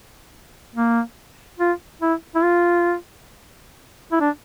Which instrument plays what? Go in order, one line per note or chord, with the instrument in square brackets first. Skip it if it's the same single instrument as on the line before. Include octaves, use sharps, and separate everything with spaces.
[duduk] A#3
F4
E4
E4
F4
E4
D4